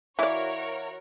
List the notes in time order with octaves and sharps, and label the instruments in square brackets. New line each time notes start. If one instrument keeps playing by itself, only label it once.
[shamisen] E3 D5 [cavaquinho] E4 F5 [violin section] F#4 A#4 C#5